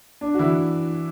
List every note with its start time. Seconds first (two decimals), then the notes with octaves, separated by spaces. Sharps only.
0.21 D4
0.34 F#4
0.39 E3 E4